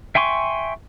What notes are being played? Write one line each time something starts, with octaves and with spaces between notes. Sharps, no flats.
E5 G5 G#5 C6 C#6